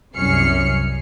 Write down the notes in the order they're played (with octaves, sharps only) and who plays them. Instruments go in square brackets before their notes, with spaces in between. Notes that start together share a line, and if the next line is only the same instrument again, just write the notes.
[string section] C2 F#2 C#4 F6 C7 C#7